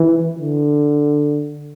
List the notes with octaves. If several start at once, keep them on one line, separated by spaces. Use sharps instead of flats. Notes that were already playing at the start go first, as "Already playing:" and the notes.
Already playing: E3
D3